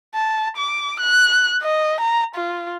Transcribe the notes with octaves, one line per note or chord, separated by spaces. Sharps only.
A5
D6
F#6
D#5
A#5
F4